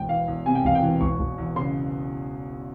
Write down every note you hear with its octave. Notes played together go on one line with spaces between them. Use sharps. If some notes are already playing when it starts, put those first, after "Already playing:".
Already playing: E1 G5
E3 F5
E2
C3 G#5
G5
E1 F5
G5
E3
E1 C#6
E1
E2
C#3 C6